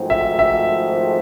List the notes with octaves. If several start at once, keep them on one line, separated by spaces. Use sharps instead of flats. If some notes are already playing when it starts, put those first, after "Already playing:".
Already playing: G#1 G#2 F3 A3 C4
E5
E5